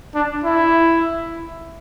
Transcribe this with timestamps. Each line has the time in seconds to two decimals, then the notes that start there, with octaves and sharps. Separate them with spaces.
0.14 D4
0.44 E4